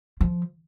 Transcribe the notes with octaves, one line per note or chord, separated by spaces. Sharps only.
F3